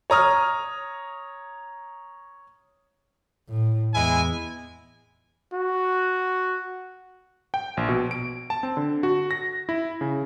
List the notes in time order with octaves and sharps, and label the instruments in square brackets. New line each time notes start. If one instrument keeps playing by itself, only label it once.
[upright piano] C#5 A#5 D#6 F6
[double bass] A2
[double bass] E2 [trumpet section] G#3 E4 G#5
[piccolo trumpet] F#4
[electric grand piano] G5
A#1
B2
D7
A5
C4
D3
F#4
A#6
E4
C#3